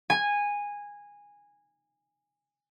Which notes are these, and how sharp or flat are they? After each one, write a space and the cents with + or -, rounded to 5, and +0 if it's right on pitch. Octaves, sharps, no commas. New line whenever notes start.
G#5 -15